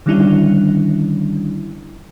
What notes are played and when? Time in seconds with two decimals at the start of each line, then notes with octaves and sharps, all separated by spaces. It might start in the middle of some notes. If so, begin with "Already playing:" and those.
0.06 D3 D#3 G3 C#4 D4 E4